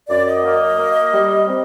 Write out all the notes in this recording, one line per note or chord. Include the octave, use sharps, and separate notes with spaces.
F#2 D5
D#5
A#3
A#3
G3
C4